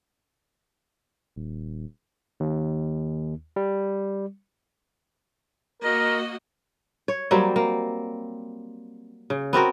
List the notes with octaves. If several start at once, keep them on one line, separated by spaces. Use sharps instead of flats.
D#1
D#2
G3
A#3 F#4 A#4 D#5
C#5
F#3 G3 A#3 C4
A#3
C#3
B3 C4 F#4 A#4